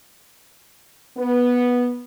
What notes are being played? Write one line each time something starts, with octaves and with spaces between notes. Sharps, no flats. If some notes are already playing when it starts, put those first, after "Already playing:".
B3